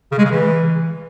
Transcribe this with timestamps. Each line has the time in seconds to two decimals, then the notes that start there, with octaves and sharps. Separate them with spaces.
0.12 C#3
0.18 G#3
0.25 C#3
0.31 E3